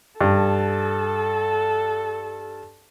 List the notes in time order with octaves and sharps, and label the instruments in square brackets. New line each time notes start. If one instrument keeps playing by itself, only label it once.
[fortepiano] G2 [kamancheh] A4